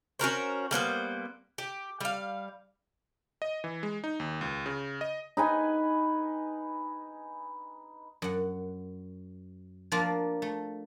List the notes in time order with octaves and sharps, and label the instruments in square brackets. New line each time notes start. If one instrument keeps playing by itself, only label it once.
[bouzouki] C#4 F#4 A#4 C5
G3 A#3 B3 C5
G4
G3 F5
[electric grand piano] D#5
E3
G#3
D#4
D#2
C#2
C#3
D#5
[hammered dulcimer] D#4 B4 G#5
[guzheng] F#2 F#5
F3 A#3 D4 F4 D5
A3